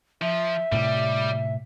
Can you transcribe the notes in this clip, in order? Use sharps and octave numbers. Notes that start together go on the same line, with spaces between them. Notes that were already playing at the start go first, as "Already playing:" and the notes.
F3 E5
A2 C3 G3